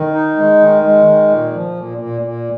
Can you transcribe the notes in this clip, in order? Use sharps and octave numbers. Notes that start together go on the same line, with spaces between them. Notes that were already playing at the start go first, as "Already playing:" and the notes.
Already playing: D#3
D#4
G#3
D#3
G#3
D#3
A#2
F3
A#2
A#2
A#2